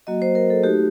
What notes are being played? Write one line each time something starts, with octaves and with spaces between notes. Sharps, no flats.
F#3 A#3 F#4 D#5
C5
A#4
A4
A3 D#4 F#4 G4